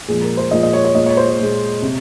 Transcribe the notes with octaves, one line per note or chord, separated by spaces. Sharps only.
A#2 F3 G#3 G#4
A#4
C5
A#2 F3 G#3 D#5
D#5
C#5
C#5
A#2 G#3 D#5
C#5
C5
C#5
A#2 G#3
C3